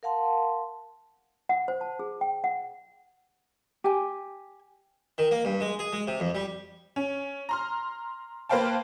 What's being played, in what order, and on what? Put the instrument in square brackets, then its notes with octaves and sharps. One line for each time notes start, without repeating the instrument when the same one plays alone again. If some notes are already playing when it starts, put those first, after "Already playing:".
[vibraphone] A#4 F5 F#5 A5 C6
[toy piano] F#5
C5
A5
G#4
G5
F#5
[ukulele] G4 G#5
[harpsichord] D#3
A#3
G2
G#3
G#4
G#3
C3
F2
G3
[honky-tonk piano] C#4
A#5 C6 F6
A#3 B4 C5 F5 G5 A5